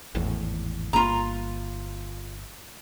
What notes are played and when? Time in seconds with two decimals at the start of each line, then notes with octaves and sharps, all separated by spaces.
0.15 G#1 E2 A2
0.93 G1 A#3 F4 A#5